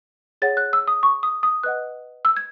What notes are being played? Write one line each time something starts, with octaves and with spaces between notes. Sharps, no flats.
G#4 C#5 F#5 A6
F#6
E6
D#6
C#6
D#6
D#6
B4 D#5 F#5 F#6
E6
G#6